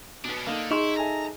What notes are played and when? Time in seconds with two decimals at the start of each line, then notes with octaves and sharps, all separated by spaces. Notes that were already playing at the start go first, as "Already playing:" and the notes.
0.24 B2 B3 C#4 D4
0.47 D3 A#3 D#4 A4
0.71 D#4 E4 G#4 C6 C#6 F7
0.97 A4 E5 G#5 A#5